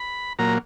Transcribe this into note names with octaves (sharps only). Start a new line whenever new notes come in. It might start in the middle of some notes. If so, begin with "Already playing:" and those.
Already playing: B5
A#2 F#3 A#3 A#5